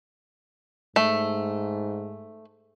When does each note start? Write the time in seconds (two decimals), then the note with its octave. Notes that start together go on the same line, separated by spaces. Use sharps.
0.96 G#2 A3